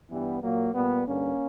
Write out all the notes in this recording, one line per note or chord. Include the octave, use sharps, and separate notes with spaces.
G2 E3 G3 B3
A#2 F#3 A#3
A#2 G3 B3
G2 D3 A#3 C#4